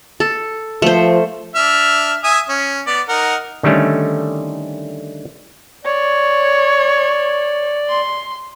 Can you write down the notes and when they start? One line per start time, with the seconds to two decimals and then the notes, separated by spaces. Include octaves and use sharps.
0.20 A4
0.82 F3 A3 C5
1.55 D4 E5 F6
2.24 E5 G#5 D#6
2.49 C#4
2.87 B3 D5
3.09 D#4 A#4 F#5
3.63 D3 D#3 G3 A3 C#4
5.85 C#5 D5
7.89 C6